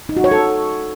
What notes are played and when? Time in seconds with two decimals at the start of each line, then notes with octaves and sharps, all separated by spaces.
0.09 D#4
0.17 F#4
0.24 C#5
0.32 A4